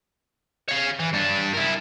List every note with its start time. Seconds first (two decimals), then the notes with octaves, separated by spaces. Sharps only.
0.68 C#5 F5
1.00 E3
1.13 G2 D4
1.53 E4 A#4